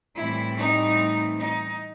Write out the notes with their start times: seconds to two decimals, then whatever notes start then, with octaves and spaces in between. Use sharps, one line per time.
0.17 A2 E3 G3 C4 E4
0.59 D#4
1.41 D#4